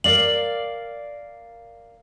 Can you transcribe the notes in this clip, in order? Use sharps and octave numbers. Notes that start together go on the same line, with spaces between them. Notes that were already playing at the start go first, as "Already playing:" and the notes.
A#4 D5 F5 F#7